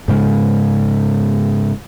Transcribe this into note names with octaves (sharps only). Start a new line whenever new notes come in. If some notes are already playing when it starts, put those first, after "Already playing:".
G#2 C#3 G#3